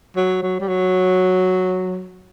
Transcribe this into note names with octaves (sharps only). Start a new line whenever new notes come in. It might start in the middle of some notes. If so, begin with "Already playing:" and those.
F#3
F#3
G3
F#3